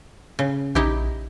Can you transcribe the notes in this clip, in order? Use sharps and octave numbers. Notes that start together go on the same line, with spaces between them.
C#3
A#1 D#4 E4 G4